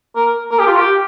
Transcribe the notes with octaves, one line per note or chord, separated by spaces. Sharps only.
A#4
A#4
G4
F4
G4